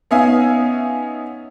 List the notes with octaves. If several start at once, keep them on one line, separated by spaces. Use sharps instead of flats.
B3 C#4 D#4 E5 F5 G#5